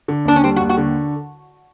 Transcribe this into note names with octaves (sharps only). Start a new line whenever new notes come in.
D3
D#2 D4
C#4
G3 C4
F#4
D#2
F#4
D3